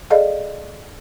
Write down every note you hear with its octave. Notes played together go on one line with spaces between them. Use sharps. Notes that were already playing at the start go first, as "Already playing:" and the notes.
G#4 A4 D5 D#5 F5